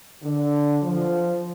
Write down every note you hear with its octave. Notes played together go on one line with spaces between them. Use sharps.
D3
F3